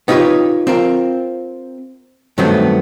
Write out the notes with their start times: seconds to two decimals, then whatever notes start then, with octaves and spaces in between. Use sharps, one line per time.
0.08 B3 D#4 F4 G4 B4 C#5
0.67 C4 F4 A#4
2.38 G2 D#3 F#3 A3 B3 C4